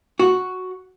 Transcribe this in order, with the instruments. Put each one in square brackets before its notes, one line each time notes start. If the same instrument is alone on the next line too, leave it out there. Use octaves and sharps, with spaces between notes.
[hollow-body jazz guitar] F#4